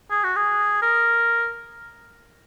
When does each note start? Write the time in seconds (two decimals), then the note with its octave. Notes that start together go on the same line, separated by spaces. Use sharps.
0.11 G#4
0.24 F#4
0.36 G#4
0.82 A#4